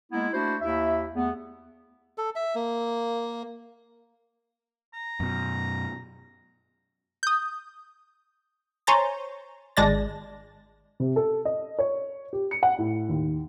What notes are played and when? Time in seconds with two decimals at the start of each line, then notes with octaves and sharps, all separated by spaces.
0.12 G#3 A#3 B3 E4
0.32 A3 D4 E4 F#4 C5
0.61 D#2 E4 E5
1.15 E2 A3 B3
2.18 A4
2.36 E5
2.55 A#3
4.94 A#5
5.20 F#2 B2
7.23 D#6 G6
8.87 C5 C#5 G#5 A#5 G6 A6
9.77 G#1 G#3 D4 D5 A6 A#6
11.00 C3
11.16 A4
11.45 D#5
11.79 C#5
12.33 G4
12.51 C#7
12.63 F#5
12.78 A2
13.09 D#2